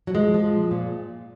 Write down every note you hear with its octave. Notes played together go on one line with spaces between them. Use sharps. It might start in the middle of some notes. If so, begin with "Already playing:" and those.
F#3
F3 G#3
F3
A#2
A#2